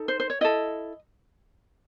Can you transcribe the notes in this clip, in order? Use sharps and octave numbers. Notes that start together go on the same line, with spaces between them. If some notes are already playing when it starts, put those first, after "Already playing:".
Already playing: D#4 A4
C5
C5
C#5
E4 A4 D#5